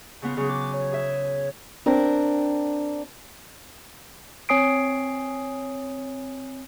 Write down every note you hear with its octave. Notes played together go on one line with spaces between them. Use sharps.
C#3 B3 F4
C#3 F#3 G#4
D6
C#5
G#4 E5
C4 D4 A#4
C4 C#5 G#5 D#6 C7 D7